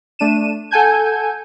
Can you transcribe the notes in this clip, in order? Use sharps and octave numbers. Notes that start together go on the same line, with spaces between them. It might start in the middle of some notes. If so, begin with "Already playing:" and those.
A3 D4 D#7 E7
A4 F#5 G#5 A5 G6 G#6